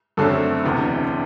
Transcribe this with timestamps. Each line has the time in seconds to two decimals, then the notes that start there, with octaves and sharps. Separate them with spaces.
0.17 F#2 D3 F#3 A3 C4 A4
0.64 E1 D2 C3 E3 B3